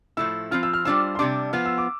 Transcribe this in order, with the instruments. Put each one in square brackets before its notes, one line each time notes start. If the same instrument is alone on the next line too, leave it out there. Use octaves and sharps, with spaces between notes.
[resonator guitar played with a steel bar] A2 F3 A3 E4 [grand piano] E6
[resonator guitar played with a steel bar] F3 C4 F4 [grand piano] F6
[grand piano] E6
F6
[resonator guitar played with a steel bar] G3 D4 F4 C5 [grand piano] E6
[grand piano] C6
[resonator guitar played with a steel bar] C3 G3 D4 [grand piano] D6
[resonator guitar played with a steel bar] F3 B3 F4 [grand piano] F6
[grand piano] E6
D6